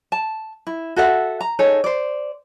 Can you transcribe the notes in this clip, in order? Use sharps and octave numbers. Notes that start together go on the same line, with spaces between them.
A5
E4
F#4 A4 E5 F#5
A#5
D#4 G#4 A4 C#5
C5 D5